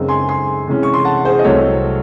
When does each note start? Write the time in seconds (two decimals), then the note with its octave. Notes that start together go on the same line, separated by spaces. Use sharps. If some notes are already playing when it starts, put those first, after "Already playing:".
Already playing: F#2 C#3 G#3 C4 D#4
0.08 G#5 C6
0.29 G#5 C6
0.67 C3 E3 G#3 C#4
0.83 C#6
0.94 C6
1.05 F#5 A5
1.25 G#4 C5
1.39 D#5
1.44 C2 C3 F#3 A3 C4 A4 C#5